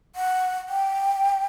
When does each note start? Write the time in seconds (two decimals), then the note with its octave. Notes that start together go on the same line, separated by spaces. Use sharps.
0.16 F#5
0.69 G5